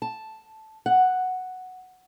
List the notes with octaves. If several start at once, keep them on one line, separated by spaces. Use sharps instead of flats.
A5
F#5